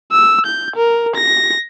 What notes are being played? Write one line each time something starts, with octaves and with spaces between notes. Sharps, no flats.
E6
G6
A#4
A#6